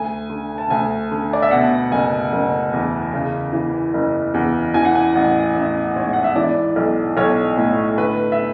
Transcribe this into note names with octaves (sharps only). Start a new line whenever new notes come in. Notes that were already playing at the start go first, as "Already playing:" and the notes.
Already playing: D2 G#5
D3
A5
D2 G#5
D3
D5
E5
B2 F#5
F#1 G#5
F#1
E2
C#3
E3
F#1
E2
E3 G#5
F#5
G#5
A1 F#5
A1 E5
G#2 C#5
F#5
E5
E3 D5
B1
B1 C#5
A2
D3 B4
E5